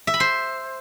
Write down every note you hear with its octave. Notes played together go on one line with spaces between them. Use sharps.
E5
B5
C5